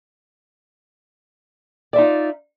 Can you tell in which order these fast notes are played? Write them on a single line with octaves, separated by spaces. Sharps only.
D5 E5 D#4 F4